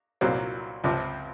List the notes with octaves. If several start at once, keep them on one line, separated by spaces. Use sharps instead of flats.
C2 A#2 F#3 C4 F4
C#2 C3 F3 C4